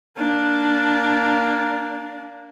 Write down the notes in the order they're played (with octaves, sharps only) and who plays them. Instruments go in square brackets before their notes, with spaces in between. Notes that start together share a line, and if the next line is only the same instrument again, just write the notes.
[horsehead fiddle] A#3 D4